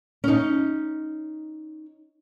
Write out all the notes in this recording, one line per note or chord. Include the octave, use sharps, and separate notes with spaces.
C#4 D#4